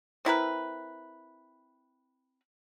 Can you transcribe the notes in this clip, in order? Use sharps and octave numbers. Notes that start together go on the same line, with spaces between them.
C4 E4 A#4 B4